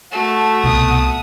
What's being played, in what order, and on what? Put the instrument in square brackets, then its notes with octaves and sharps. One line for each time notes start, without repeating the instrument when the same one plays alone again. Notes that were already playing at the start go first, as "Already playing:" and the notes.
[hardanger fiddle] A3 [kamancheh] F#4 A4
[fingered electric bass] C2 B2 [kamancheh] F#5 D#6